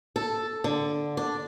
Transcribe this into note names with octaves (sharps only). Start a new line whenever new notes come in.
A4
D3
D4